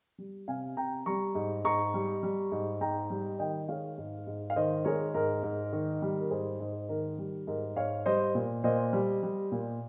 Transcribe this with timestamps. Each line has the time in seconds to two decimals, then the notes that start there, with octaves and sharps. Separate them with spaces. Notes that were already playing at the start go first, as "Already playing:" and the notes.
0.18 G3
0.48 C3 F5 G#5
0.77 C3 G5 A#5
1.06 G3 A#5 C#6
1.35 G#2
1.65 G#2 A#5 C#6
1.94 G3
2.23 G3
2.52 G#2
2.81 G#2 G5 A#5
3.10 G3
3.39 D#3 D#5 G5
3.68 G#3 C#5 F5
3.98 G#2
4.27 G#2
4.50 F5
4.56 D#3 C5 D#5
4.85 G#3 A#4 C#5
5.14 G#2 A#4
5.43 G#2
5.73 D#3
6.02 G3
6.20 A#4
6.31 G#2 G#4 C5
6.60 G#2
6.89 D#3 A#4
7.18 G3
7.47 G#2 A#4
7.76 G#2 C#5 F5
8.06 G3 C5 D#5
8.35 A#2
8.64 A#2 C5 D#5
8.93 G3
9.23 G3
9.52 A#2